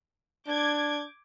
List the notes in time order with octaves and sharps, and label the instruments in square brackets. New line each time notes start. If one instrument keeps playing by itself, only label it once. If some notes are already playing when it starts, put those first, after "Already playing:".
[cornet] D4 [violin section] D6 G6 G#6